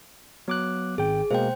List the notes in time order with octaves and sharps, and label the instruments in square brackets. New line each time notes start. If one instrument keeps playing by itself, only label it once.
[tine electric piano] F#3 D6 F#6 [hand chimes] B3
[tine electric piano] G#1 G5 [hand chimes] G#4
[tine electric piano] B2 G#3 A#3 [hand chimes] C5 G5